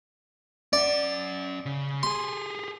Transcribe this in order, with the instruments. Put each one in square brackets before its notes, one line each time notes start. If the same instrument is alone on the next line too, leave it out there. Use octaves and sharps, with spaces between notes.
[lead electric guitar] C#4 F#5 [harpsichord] D5
[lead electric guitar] C#3
[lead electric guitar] G4 G#4 [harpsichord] C6